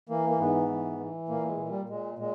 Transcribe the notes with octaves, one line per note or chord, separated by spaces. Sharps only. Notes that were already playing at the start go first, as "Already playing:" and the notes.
E3 A#3
A#3
G#2 B3
E3
E3
A#2 A#3
G#3
A#2
G3
A#2 G#3
A#2 G#3